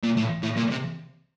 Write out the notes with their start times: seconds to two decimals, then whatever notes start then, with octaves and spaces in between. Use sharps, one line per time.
0.03 A#2
0.17 A2
0.43 A2
0.57 A#2
0.70 C3